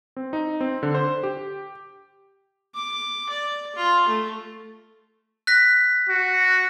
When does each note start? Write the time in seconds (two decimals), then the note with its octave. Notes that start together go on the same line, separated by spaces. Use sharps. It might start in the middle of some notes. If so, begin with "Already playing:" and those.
0.17 C4
0.33 D#4
0.61 C4
0.83 D3
0.95 C5
1.23 G4
2.74 D6
3.30 D5
3.76 F4
4.08 A3
5.47 F#6 A#6 B6
6.09 F#4